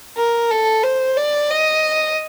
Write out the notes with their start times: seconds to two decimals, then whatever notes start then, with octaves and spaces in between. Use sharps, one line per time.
0.17 A#4
0.51 A4
0.83 C5
1.17 D5
1.51 D#5